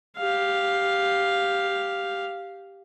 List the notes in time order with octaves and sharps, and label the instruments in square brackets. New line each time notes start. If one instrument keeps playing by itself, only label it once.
[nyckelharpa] G4 F5